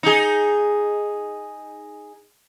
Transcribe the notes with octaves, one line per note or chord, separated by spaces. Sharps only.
D#4 G#4